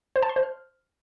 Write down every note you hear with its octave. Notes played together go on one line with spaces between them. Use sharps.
C5
A5
C6
C5
F6